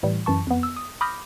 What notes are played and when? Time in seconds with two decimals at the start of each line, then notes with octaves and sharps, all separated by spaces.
0.03 A2 E3 G3
0.26 F#2 E3 A5 C#6
0.47 F2 B3
0.63 E6
0.76 D#6
1.01 B5 D6 D#6 F6 G6 A#6